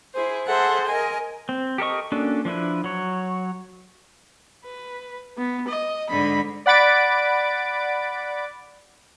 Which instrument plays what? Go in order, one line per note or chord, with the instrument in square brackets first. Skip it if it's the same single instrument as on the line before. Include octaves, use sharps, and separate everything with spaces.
[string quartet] E4 G#4 C5
G#4 A4 C5 E5 F#5
A#4 D#5 G#5
[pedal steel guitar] C4
G4 A4 A#4 D#5 C#6
A#3 C#4 D4 F#4 A4
F3 D4 E4 B4
F#3 C#5
[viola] B4
B3
D#5
[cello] G#2 D3 [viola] B5
[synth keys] D5 F#5 B5 A6 D7